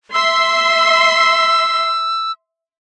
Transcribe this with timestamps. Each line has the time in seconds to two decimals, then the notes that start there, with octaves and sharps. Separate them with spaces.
0.14 E5 C6 E6